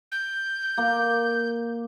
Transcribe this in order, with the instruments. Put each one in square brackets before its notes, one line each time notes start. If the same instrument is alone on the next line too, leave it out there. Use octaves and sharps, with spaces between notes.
[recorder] G6
[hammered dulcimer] A#3